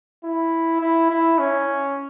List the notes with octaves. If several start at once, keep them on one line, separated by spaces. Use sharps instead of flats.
E4
E4
E4
C#4